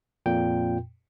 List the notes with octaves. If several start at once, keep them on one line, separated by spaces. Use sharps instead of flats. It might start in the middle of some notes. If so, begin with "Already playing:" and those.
F2 A#2 G5